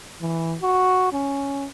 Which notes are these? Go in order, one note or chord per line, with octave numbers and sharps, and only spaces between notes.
E3
F#4
C#4